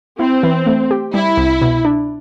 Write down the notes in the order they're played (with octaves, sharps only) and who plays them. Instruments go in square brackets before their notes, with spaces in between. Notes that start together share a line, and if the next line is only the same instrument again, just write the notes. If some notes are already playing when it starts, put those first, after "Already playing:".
[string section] C4 [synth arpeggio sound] E4
[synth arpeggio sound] E3
A3
G4
[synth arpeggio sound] G3 [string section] E4
[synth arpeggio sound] C2
B2
D4